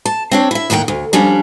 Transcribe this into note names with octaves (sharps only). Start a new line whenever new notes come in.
A5
C4 D4 C#5
E4 E5
D#2 A2 D#3 F#5 G5
D2
F3 G3 C#4 D4